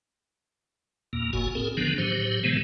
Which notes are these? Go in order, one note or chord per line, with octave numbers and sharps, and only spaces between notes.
E2 A#2 A#3
F#1 B1 A2 F#4 G#5
C4 G#4 A#4
D3 D#3 F3 B3 D4
A2 F#3 G4 C5
C3 D#3 E3 G#3 A3 B3